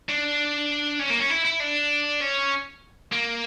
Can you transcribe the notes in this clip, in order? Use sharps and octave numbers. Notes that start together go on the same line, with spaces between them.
D4
C#4
A#3
C#4
E4
E4
D4
C#4
A#3